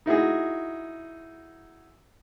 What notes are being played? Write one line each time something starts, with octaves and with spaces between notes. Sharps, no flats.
D#4 E4 F#4 G#4